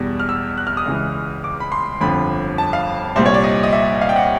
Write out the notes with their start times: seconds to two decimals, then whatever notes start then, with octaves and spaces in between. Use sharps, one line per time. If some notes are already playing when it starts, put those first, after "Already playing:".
Already playing: E2 B2 G3
0.19 F6
0.29 E6
0.57 F#6
0.67 F6
0.77 D#6
0.86 C#2 C#3 E3 G#3
1.44 D6
1.60 B5
1.72 C6
2.01 G1 F2 D3 F3 B5
2.58 A5
2.73 F5
3.16 C2 A#2 G3 C5
3.26 C#5
3.34 D5
3.43 D#5
3.63 D#5
3.73 E5
4.01 F5
4.09 G5
4.16 F#5